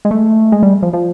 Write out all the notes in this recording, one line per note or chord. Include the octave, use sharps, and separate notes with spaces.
G#3
A3
G#3
G3
F3
F3